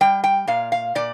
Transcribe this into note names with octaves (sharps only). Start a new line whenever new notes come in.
G3 G5
G5
A#2 F5
F5
A#2 D5